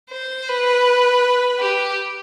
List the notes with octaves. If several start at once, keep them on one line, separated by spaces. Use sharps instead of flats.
C5
B4
G4